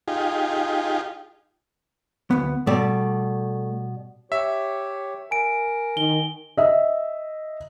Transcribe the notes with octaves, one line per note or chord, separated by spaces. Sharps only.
D#4 F4 G4 G#4
D2 G#2 B3
B2 G3 A3 D5
G4 C#5 E5
A#4 G#5 D7
D#3 G7
D#5 E5